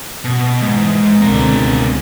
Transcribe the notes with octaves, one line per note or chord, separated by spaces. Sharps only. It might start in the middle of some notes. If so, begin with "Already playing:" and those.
B2
A#1 G#2 E3
C#2 B2 D3 C4 A#4